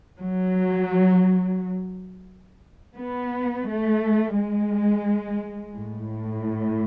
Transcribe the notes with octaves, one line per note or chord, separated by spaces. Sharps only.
F#3
B3
A3
G#3
A2